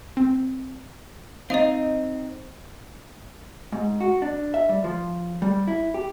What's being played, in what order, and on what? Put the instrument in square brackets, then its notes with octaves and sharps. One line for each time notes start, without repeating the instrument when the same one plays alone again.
[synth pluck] C4
[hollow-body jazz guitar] C4 D#4 [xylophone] D#5 F5
[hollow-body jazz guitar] G#2
F#4
D4
E5
G3
F3
G3
E4
G4